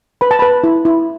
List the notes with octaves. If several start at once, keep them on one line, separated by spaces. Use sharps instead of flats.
B4 B5
A5
B4 B5
E4
E4